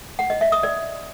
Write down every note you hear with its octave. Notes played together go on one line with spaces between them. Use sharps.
F#5
D#5
E5
D#6
D5